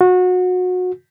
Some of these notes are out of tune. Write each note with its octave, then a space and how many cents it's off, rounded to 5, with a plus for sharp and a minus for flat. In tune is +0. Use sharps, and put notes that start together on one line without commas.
F#4 -25